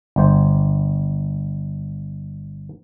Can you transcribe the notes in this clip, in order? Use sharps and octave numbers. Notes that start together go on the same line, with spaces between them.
G1 C5